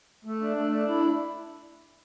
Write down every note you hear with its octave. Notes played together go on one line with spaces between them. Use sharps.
A3
D4
A3
D4
E4